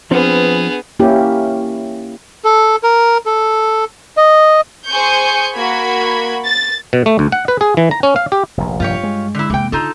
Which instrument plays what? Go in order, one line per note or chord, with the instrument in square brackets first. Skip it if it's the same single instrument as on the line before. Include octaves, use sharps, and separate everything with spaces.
[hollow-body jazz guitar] F3 C4 [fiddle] B3 G#4 [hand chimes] D4 B4
[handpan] A#3 C#4 E4 G4
[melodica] A4
A#4
A4
D#5
[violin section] G#4 C5 G#5 C#6 G6 C#7
A#3 F#4 B5 G#6
A6
[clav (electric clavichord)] B2
A3
D2
F#5
B4
G#4
E3
A#5
C#4
F5
G4
[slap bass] F1 A#1
[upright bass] G2 [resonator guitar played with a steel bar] F4 G4 C#5
[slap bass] G#3
[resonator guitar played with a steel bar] D3 E4
[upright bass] F1 A#3 [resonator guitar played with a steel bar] E3 G5
[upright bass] D3 [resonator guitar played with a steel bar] D#4 F4 A4